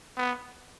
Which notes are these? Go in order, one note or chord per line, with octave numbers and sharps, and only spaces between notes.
B3